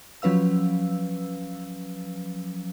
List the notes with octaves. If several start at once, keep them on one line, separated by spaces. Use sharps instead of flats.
F3 F#3 C#4 B4 F5 E6